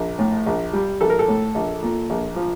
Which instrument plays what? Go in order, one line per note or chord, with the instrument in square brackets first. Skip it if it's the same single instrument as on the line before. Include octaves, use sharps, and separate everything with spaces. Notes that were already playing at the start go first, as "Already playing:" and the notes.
Already playing: [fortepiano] A#1
A2
A#1
G3
A#1 A4
A#4
A4
A2
A#1
A#2
A#1
F3